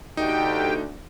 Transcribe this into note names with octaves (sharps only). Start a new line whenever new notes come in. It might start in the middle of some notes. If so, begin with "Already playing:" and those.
D2 D#4 G4 G5